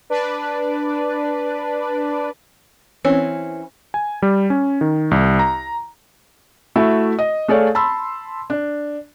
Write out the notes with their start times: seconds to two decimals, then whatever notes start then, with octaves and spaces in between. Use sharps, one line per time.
0.10 D4 B4 D5
3.05 E3 C4 C#4
3.94 G#5
4.22 G3
4.50 C#4
4.81 D#3
5.11 C2
5.39 A#5
6.76 A3 E4 F#4 E5
7.19 D#5
7.48 A3 G#4 A4 C#5 D5 F5
7.75 A5 B5 C6 E6
8.50 D4